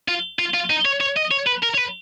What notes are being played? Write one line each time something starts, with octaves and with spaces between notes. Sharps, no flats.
F4
F4
F4
D#4
C#5
C#5
D#5
C#5
B4
A#4
C#5
B4